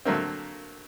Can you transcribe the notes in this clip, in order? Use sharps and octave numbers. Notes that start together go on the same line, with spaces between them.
D3 F#3 A3 A#3 C4